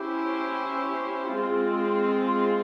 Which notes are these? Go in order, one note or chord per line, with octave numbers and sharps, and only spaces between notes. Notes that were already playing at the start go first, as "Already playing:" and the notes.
Already playing: C#4 E4 G4 C5
G#3 C4 F4